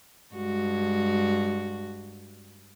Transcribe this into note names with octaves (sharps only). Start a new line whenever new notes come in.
G2 G#3 F#4